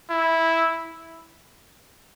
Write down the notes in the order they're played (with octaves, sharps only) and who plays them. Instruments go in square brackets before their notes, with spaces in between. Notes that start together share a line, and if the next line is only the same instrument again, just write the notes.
[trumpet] E4